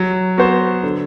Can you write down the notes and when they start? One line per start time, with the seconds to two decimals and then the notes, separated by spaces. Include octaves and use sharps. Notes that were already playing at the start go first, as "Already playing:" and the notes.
Already playing: F#3
0.38 B3 F#4 C5
0.83 D3